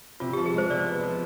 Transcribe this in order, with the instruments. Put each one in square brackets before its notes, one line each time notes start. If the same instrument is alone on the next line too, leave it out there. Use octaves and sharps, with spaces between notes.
[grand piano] C3 [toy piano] F4
[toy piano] G4
[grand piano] F3
[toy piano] G#4
[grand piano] G#3 [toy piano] C5
[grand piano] C3 [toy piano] D5
[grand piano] B3
F3